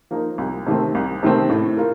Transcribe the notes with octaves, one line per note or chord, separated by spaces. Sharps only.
F3 A#3 D#4 A#4
C2
C3 D#3 A3 C4
C2
C3 D#3 A3 C4
A2
F4 A#4